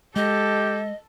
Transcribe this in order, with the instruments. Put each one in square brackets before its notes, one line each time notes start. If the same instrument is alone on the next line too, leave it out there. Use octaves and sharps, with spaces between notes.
[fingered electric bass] G#3 [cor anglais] G4 [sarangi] A4 [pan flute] D#5